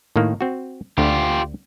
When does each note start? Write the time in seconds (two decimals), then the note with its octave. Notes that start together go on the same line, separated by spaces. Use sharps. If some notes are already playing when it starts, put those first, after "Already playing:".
0.16 A2 D#3 A#3
0.41 C4 F#4
0.98 D2 D3 F4 G4